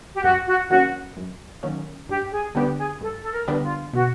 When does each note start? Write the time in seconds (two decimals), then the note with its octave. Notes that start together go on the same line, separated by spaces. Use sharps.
0.14 G4
0.24 F#2 F#4
0.48 F#4
0.70 D#3 F#3 A#3 C#4 F#4
1.17 F#2
1.63 D#3 F#3 A#3 C#4
2.09 G2 G4
2.32 G#4
2.55 D3 G3 B3 D4 G4
2.78 G#4
3.01 G2 A4
3.22 A4
3.32 A#4
3.48 D3 G3 B3 D4
3.63 F4
3.93 B2 F#4